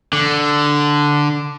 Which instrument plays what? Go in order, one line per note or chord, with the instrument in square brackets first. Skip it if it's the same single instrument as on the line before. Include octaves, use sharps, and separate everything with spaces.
[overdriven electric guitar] D3